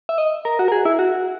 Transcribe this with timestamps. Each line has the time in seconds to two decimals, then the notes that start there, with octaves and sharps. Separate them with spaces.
0.09 E5
0.18 D#5
0.45 A#4
0.59 F#4
0.68 A#4
0.72 G#4
0.85 E4
0.99 F#4